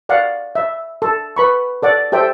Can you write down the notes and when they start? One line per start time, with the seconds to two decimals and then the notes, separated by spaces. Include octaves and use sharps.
0.09 D5 F5 F#5
0.55 E5
1.02 A4
1.36 B4 B5 C#6
1.82 A4 D5 F#5
2.12 G4 A4 C5 E5 G5